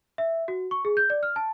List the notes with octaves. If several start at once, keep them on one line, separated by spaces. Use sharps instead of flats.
E5
F#4
C#6
G#4
G6
D5
F6
A5